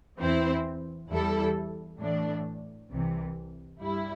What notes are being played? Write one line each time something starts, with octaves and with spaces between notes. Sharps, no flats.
E2 E3 C4 E4 C5
E2 E3 G3 E4 A4
A2 E3 A3 D4
C2 C3 E3
G2 G3 E4